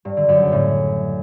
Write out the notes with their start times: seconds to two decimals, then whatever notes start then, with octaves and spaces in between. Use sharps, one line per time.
0.05 G2
0.17 D3
0.29 F#2
0.40 C#3
0.52 A2